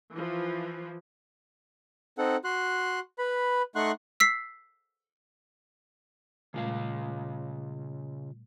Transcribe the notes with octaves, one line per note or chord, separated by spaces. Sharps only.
E3 F3
C4 D#4 A4 F#5
F#4 C6 F#6
B4 B5
A3 D#4 F#5 C6 C#6 F#6
E6 B6 C7
A#2 C#3 G3 A3 F4 F5